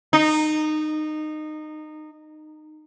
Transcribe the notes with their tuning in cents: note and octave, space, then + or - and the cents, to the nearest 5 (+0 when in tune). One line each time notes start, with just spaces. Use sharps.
D#4 -20